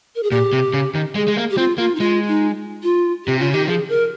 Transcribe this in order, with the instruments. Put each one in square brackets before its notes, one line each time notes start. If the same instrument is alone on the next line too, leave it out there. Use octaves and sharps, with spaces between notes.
[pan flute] A#4
G#4
[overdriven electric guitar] A#2 [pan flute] G4
[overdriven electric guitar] C3
C#3
D#3
[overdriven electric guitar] G#3 [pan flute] G#4
[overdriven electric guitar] G#3
A#3
[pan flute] G4
[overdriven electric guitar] C4 [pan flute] F4
[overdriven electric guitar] A#3 [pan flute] F4
[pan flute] D#4
[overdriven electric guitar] G#3 [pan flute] F4
[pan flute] D#4
F4
[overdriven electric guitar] C3 [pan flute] G4
[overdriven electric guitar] C#3 [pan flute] F4
[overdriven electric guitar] D#3 [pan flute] G4
[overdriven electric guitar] F3 [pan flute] G#4
[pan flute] A#4